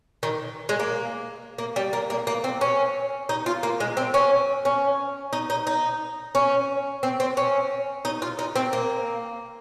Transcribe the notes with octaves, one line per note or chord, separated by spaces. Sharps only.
D#3
G#3
A#3
A#3
G3
A#3
A#3
A#3
C4
C#4
D#4
F4
A#3
G#3
C4
C#4
C#4
D#4
D#4
D#4
C#4
C4
C4
C#4
D#4
F4
D#4
C4
A#3